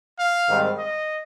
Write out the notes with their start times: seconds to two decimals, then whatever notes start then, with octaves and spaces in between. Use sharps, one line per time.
0.19 F5
0.48 G#2 D#3 G3 C4
0.78 D#5